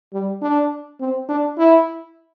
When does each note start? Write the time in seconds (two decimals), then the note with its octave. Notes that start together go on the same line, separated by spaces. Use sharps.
0.13 G3
0.42 D4
1.00 C4
1.29 D4
1.58 E4